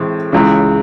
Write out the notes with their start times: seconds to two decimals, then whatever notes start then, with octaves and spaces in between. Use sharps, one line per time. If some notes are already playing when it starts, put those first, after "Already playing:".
Already playing: A2 E3 G#3 C4
0.32 C#2 C#3 E3